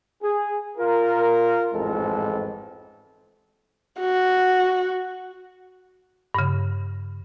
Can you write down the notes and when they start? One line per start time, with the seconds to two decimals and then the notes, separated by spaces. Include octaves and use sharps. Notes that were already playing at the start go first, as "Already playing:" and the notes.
0.23 G#4
0.78 F4 A#4
1.74 A1 F2 G#2 G#3 C4 A4
4.00 F#4
6.35 G2 C#3